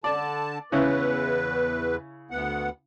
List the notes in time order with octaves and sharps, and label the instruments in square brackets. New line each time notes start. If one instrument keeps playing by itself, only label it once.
[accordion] D3 A5 [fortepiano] D5
[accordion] E2 B4 [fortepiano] C#3 C#4 E4
[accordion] D2 B3 F#5